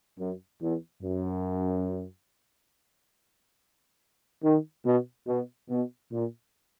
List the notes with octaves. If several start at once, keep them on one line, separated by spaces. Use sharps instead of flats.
F#2
E2
F#2
D#3
B2
B2
B2
A#2